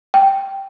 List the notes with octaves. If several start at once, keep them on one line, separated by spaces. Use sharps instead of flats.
G5